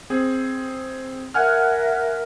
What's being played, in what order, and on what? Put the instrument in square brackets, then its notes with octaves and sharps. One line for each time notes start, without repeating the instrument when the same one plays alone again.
[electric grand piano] C4 G#4
[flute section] A#4 E5 [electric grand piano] F#5 G#5 F6